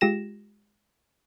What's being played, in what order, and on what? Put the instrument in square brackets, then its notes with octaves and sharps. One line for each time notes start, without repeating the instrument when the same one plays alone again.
[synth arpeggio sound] G#3 F4 G4 A#6 E7